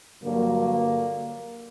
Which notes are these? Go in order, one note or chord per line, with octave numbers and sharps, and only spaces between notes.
G2 D3 F#3 A#3